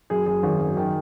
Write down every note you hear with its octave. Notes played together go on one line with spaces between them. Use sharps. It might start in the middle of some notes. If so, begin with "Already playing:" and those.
F#2 G#4
F#2 G#4
G#1
F#2
D#3